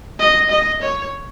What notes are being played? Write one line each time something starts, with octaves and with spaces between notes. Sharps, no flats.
D#5
D#5
C#5